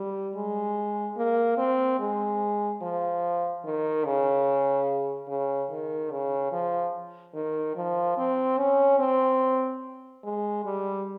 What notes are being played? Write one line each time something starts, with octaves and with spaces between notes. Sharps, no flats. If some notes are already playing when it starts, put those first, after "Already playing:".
Already playing: G3
G#3
A#3
C4
G#3
F3
D#3
C#3
C#3
D#3
C#3
F3
D#3
F3
C4
C#4
C4
G#3
G3